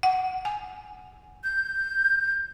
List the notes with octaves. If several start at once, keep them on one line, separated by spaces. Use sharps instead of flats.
F#5
G#5
G6